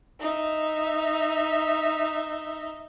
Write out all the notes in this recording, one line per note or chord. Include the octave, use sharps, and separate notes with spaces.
D#4 E5